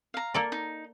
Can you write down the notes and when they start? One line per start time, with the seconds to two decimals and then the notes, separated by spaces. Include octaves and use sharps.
0.14 F5 A#5
0.34 A#3 A4 D5
0.52 D#4